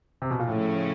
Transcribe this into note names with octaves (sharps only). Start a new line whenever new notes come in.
C3
B2
A#2
A2 C#3 F3 A3 C#4